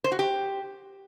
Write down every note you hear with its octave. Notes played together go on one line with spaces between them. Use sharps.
C5
F#4
G4